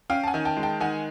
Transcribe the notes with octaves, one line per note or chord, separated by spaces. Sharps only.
C#4 F5 G5
A5
F#5 G#5
D#3
G5 A5
G#3
G5 A5
D#3 F#5 G#5